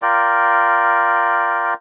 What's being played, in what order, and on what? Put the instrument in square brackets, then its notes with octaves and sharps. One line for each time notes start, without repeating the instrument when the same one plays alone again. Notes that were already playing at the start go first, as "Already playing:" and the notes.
[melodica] F4 A#4 D5 G5